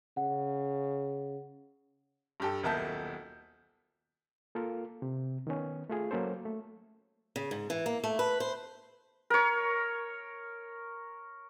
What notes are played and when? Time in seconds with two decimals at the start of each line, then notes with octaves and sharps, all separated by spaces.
0.17 C#3 F#5
2.40 G2 G4 A4
2.63 D#1 B1 A#4 E5 A5 G6
4.55 A#3 F4 A4 A#4
5.02 C3
5.47 D#3 B3 C#4
5.90 A3 F4 G#4
6.11 F#3 A#3 C#4 A4 C5
6.45 A3
7.36 C#3
7.51 G#2
7.70 E3
7.86 A#3
8.04 A3
8.19 B4
8.40 C5
9.30 A#4 C#5